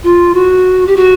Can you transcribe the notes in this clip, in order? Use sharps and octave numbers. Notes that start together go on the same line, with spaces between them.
F4
F#4
G4
F#4